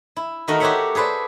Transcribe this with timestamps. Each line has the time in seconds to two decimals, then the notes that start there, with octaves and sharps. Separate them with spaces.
0.16 E4
0.48 D#3 A3 F#4 A#4 D#5 F5
0.60 F#4 G4 C5 C#5 E5 F#5
0.95 G#4 A4 B4 C5 D5